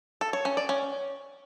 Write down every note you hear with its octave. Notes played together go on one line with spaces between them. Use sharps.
A4
C#5
C#4
D5
C#4